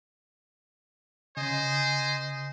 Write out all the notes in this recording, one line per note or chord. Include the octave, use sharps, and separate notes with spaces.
C#3 C5 D#5 G#5